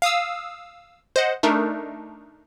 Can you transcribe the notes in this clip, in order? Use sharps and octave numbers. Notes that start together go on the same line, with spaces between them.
F5 D#6 E6
C5 D#5 F#5
A3 D4 D#4 A#4